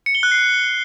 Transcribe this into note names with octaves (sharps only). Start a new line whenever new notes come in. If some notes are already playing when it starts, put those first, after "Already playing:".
C#7
G7
F#6
C7